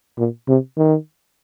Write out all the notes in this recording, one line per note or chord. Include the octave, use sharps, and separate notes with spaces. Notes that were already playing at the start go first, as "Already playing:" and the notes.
A#2
C3
D#3